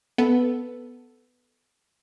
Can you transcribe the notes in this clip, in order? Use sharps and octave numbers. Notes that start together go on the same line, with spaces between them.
B3 A4